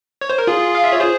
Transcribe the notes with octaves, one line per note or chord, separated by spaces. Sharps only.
C#5
C5
A#4
F4 G#4
F5
E5
C#5
G#4 C5